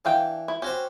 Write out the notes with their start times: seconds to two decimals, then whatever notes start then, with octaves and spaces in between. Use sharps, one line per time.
0.05 E3 D4 F5 G5
0.48 E4
0.62 C#4 F#4 G4 C5